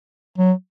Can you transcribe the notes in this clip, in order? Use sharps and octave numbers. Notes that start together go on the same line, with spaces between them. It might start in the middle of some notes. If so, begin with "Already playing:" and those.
F#3